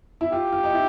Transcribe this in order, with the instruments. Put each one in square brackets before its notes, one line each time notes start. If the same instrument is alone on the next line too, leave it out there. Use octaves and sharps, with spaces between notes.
[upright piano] E4
[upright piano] F4 [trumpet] G4
[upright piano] F4
D#4
E4